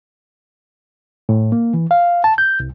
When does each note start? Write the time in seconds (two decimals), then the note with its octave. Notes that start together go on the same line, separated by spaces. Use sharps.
1.29 A2
1.52 A#3
1.74 E3
1.91 F5
2.24 A5
2.38 G6
2.60 C2